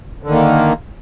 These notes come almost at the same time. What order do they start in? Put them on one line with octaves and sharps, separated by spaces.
D3 D#3 A#3